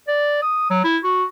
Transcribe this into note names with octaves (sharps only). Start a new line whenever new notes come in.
D5
D#6
F#3
E4
F#4